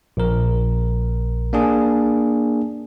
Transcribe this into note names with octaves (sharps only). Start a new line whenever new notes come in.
A#1 A#4
A#3 D4 G#4